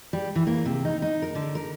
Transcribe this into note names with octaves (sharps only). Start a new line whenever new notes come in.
G3
E3
A#3
C3
D#4
D#4
A#4
D3
A#4